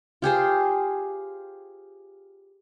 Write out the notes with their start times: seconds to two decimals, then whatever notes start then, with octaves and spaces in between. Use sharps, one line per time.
0.22 F4 G4 G#4 C5